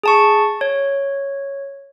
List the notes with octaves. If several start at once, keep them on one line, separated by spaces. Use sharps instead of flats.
G#4 A5 C#6
C#5